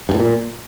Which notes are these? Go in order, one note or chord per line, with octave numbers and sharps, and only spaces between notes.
G2
A2
A#2